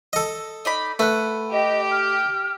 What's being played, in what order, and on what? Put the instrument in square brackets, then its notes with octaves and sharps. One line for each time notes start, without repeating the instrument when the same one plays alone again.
[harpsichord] A4 D#5
[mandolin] D#4 D5 B5
[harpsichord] A3 [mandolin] B4 F#5
[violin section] G4 [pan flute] D#5
[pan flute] F6